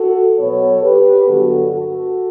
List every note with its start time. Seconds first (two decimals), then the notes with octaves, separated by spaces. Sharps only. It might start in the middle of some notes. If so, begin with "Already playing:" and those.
Already playing: F#4 A4
0.38 B2 F#3 B3 A4 C#5
0.83 G4 B4
1.27 G2 D3 F#3 B3 F#4 A4
1.71 F#4 A4